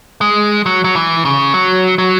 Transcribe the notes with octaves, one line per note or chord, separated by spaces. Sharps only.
G#3
F#3
F#3
E3
C#3
F#3
F#3